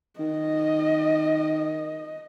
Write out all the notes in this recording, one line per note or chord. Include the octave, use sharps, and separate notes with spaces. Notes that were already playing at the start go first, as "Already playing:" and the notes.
D#3 D#5